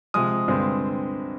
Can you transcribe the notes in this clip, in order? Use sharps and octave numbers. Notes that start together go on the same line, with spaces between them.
C3 F3 G#3 D#6
G2 D3 G#3 C4